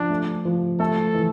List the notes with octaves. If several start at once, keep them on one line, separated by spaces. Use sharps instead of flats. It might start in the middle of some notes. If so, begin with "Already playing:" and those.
Already playing: F3 D4
A3
F3
A3 A4
E3